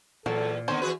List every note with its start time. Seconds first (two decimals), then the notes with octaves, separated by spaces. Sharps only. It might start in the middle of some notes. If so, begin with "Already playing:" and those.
0.26 E2 A#2 F#3 A4
0.68 D3 D#3 B3 C4 C5 C#5
0.82 E3 F#4 G#4 B4